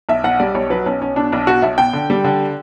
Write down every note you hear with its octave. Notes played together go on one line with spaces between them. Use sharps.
B1 E5
B1 F#5
G3 D5
B1 C#5
F#3 B4
B1 C#4
B1 C#4
B2 D4
B1 D4
B2 F#4
B1 E5
B2 G5
D3
G3
D3